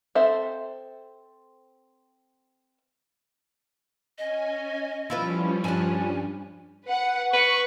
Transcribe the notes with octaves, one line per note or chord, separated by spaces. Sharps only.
C4 A4 C5 E5
C#4 D#5 G#5
F3 G3 C#4 E4 F4 B4
G2 D4 G#5
B4 F#5
B4 C#6